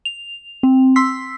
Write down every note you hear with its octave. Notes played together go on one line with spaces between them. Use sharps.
F7
C4
C6 E6 B6 C7